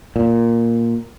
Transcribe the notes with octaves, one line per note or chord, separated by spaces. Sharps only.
A#2